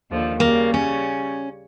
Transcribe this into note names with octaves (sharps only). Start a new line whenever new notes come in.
D#2 D3 F3
C#3 G3 A#3
C#4